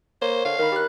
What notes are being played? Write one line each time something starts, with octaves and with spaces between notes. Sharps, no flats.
A#3 C5 C#5
D3 F5
D#3 A#4 B5
G4 F#6